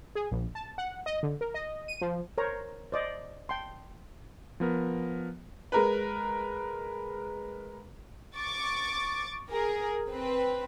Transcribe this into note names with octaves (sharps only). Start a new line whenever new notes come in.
G#4
A#1
A5
F#5
D#5
D3
A#4
D#5
D#7
F3
A#4 C5 C#5 A#5
C5 D5 D#5
G5 A5 C6
F3 B3 A#4
G#3 A#4 B4
C#6 D6 A6
G#4 A#4
C4 B4